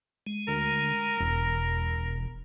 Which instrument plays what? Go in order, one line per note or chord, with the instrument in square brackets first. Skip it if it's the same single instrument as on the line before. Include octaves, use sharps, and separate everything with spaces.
[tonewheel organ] G#3
[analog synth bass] D2 [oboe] A#4
[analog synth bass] E1 [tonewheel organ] E2